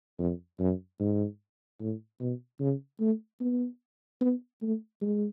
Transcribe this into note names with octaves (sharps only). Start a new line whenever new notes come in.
F2
F#2
G#2
A2
B2
C#3
A3
B3
B3
A3
G#3